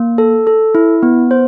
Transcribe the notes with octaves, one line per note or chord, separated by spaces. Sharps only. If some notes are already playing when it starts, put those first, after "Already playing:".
Already playing: A#3
A4
A4
E4
B3
C5